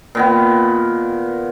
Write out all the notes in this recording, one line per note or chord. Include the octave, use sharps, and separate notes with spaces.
A#2 D#3 B3